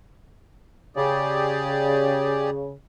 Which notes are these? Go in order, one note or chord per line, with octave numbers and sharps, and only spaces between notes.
C#3 G4 G#4 D5